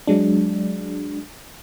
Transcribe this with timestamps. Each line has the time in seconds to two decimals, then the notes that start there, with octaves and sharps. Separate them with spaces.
0.07 F#3 G#3 D4